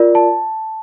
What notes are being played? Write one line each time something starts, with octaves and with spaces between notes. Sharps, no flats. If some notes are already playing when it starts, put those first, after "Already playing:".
Already playing: F4 A#4 D5
A5